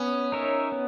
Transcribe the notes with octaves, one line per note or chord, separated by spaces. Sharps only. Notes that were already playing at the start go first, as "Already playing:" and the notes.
Already playing: B3 C#4
D#4 A#4 C#5 E5
B3